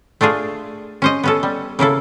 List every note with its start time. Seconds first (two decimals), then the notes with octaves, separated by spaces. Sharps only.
0.21 A3 D4 F4 G#4
1.02 C#4 C5 D#5
1.23 B3 C#4 A4
1.43 G3
1.79 C#3 A#3 E4 A4